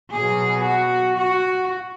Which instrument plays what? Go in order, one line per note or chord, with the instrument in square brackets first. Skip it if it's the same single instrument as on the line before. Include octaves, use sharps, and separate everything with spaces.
[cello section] B2 F#3 B3 G#4
F#4
F#4